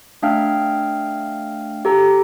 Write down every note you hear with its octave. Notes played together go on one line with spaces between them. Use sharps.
A3 D4 F5 G5 F6
G4 A4 A#5